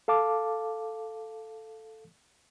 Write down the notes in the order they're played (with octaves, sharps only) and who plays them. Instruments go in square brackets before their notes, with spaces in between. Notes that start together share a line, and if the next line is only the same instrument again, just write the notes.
[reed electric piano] A4 F5 A5 D6